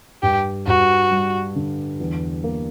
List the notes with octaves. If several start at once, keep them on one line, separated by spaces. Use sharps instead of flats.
G2 G4
G2 F#4
G3
D3
E2
A#3